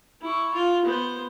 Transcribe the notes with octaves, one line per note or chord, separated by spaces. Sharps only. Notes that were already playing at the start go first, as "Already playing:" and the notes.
E4 C#6
F4
B3 C5